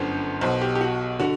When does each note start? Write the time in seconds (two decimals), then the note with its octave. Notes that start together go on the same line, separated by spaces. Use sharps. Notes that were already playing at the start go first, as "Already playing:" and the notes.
Already playing: G1 F#2 D3 C5
0.41 B1 B2 C5
0.61 G4
0.75 G4
0.81 F#4
1.19 D3 F#4